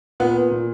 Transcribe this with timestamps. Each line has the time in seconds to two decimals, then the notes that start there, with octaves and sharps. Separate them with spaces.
0.20 A#2 B3
0.51 A#2